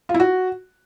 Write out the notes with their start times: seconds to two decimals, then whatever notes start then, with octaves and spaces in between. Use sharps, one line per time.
0.09 F4
0.14 E4
0.20 F#4